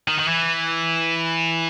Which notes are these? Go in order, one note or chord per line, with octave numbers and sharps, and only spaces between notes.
D#3
D#3
E3